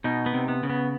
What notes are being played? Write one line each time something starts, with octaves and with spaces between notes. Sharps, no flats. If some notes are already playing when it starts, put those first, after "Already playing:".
B2 D#4
B3
C3
B3
C#3
B3